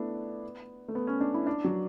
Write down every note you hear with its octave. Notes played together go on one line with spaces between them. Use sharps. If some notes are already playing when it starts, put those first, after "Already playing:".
Already playing: A3 B3 D4 E4
A3
B3
C#4
D4
E4
D4
F#3